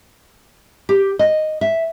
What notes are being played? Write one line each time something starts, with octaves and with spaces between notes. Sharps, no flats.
G4
D#5
E5